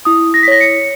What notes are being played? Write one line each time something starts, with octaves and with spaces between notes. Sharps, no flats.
E4 D#6
A#6
B6
C#5 A#6
C#7